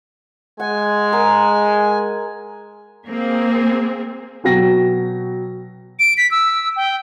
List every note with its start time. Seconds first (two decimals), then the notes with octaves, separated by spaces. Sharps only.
0.60 G#3 F#5 G#5
1.12 G#4 A#4 F#5
3.08 A#3 C4 G#4
4.44 B2 F#3 G5 A#6
5.99 D7
6.17 B6
6.31 E6
6.76 G5